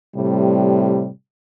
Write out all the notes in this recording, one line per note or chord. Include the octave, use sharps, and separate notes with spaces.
A2 C3 G3